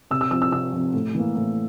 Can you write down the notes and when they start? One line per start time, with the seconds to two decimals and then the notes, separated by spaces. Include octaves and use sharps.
0.11 C3 E6
0.21 E6
0.31 F3 C4 E6
0.42 E6
0.52 C3 E6
0.72 F3 C4
0.94 A2
1.15 E3 A#3
1.35 A2